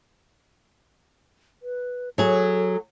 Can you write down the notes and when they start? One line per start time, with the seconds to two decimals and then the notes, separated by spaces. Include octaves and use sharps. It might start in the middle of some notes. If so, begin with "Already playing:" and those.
1.62 B4
2.18 F#3 G#4 A4